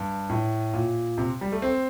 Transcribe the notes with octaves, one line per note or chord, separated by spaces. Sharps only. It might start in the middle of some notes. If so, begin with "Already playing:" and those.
Already playing: G2
A2
A#2
C3
G3
A3
C4